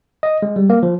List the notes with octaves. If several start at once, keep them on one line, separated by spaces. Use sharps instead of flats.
D#5
G#3
G3
A#3
F3